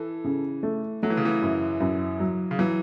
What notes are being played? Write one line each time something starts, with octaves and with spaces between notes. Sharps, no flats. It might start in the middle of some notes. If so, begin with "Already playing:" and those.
Already playing: E3 A4
C#3
A3
F#3 A3
E3
C#3
E3
F#2
F#2
F#3
C#3
E3 F#3